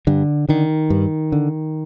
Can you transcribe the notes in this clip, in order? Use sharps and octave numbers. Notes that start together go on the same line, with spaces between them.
G2 D3
D3 D#3
G2
D3